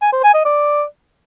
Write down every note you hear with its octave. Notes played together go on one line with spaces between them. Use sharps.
G#5
C5
G#5
D#5
D5